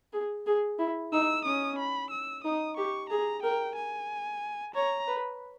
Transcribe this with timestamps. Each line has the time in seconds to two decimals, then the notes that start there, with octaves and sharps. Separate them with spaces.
0.13 G#4
0.47 G#4
0.79 E4
1.13 D#4 E6
1.45 C#4 D#6
1.79 B5
2.11 E6
2.44 D#4 D#6
2.77 G4 C#6
3.10 G#4 A#5
3.43 A#4 G5
3.76 G#5
4.75 C#5 A#5
5.08 B4